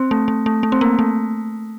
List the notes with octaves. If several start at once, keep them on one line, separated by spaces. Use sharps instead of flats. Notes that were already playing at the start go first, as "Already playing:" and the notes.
Already playing: C4
A3
A3
A3
A3
C4
A#3
A3